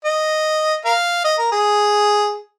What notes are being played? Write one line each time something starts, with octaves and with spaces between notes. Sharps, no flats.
D#5
A#4 F5
D#5
A#4
G#4